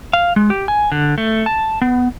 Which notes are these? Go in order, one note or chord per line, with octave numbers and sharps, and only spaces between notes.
F5
G#3
G4
G#5
D3
A3
A5
B3